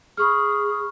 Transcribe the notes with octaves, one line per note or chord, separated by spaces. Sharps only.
G#4 B5 C#6 F6